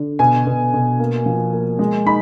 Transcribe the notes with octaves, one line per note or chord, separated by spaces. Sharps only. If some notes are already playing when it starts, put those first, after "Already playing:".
Already playing: D3
B2 G#5
B2
B2
A#3
F3
A#3
G#3
D#4 B5